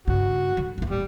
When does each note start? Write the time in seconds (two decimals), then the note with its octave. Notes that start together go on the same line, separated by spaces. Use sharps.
0.07 G2 C#3 F#4
0.57 D3 G3
0.78 D#1 A1
0.90 G3